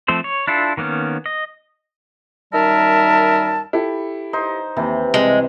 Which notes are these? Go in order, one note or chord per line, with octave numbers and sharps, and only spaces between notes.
F3 A3 C4 C5
C#5
D4 E4 F4 A4
D#3 A#3 B3 C#4
D#5
F#2 D#3 G3 A#4 E5 A5
E4 G4 A4
D#4 C5
D#2 C3 E3
C2 G#3